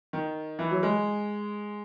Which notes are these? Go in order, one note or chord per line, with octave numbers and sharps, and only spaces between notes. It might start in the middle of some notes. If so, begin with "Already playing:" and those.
D#3
E3
F#3
G#3